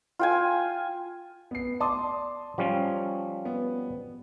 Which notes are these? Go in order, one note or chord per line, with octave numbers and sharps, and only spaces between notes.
F4 G5 G#5
B3 C7
D5 A5 C6 D#6
F3 G3 C#4
B3